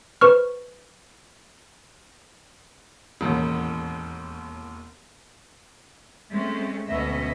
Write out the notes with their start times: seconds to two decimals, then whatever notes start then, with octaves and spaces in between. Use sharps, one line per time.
0.21 B4 C5 C#6 F6
3.21 E1 A1 D#2
6.32 G#3 A3 C4 C#4
6.89 D2 B2 C#4 D#5 E5